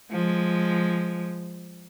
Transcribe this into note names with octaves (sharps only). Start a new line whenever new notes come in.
F3 G#3